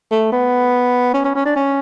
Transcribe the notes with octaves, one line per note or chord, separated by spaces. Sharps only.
A3
B3
C#4
C#4
C#4
D4
C#4